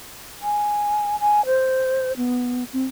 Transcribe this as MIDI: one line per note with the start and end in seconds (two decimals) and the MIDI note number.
0.42 1.19 80
1.20 1.45 80
1.46 2.13 72
2.17 2.64 59
2.73 2.83 60